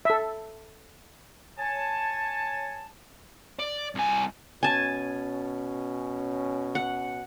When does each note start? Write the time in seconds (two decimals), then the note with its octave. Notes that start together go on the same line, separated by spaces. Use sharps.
0.05 A4 E5
1.58 C#5 G#5 A5
3.59 D5
3.95 C2 G#5
4.63 B2 C#4 G#5 A5
6.75 F#5